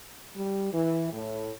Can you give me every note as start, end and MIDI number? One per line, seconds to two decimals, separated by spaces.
0.35 0.70 55
0.73 1.12 52
1.12 1.51 45